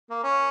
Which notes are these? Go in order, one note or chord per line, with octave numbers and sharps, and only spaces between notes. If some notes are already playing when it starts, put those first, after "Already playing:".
A#3
C#4